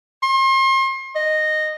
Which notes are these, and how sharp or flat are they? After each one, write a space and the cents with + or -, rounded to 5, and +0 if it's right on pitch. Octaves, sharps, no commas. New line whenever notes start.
C6 +35
D#5 -10